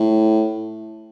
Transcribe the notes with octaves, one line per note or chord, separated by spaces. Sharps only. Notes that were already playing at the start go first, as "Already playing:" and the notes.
Already playing: A2